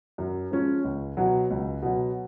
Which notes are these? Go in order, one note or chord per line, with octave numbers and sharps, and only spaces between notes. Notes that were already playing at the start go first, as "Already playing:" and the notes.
F#2
F3 G#3 C#4
C#2
B2 F#3
C#2
B2 F#3